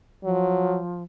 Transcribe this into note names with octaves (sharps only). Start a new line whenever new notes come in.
F3 F#3